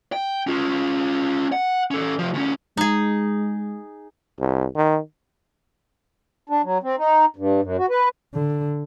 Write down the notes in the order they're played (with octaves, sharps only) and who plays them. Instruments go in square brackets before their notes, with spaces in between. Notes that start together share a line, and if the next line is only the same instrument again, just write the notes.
[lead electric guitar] G5
C#4 F4
F#5
C#4 A4
C3 F3
D2 C#4
[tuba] G#3 [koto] D#4 G#4
[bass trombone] C2
D#3
[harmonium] D4
F#3
C4
D#4
G2
F#2
F#4
B4
[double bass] D3